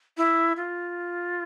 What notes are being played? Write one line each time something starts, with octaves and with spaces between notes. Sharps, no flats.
E4
F4